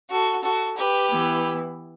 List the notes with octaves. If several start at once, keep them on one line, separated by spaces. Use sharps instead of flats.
F#4 A4
F#4 A4
G4 B4
E3 B3 E4